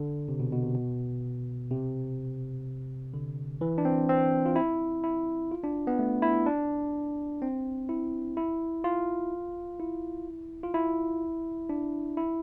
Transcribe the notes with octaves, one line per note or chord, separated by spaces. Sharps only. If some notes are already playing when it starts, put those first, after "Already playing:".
Already playing: D3
C3
B2
B2
C3
B2
C3
D3
E3
D4
C4
C4
F4
E4
E4
F4
D4
B3
A3
E4
D4
C4
E4
E4
F4
E4
F4
E4
D4
E4